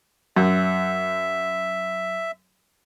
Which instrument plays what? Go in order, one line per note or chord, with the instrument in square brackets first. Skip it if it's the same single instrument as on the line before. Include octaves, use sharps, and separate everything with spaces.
[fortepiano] F#2 [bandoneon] E5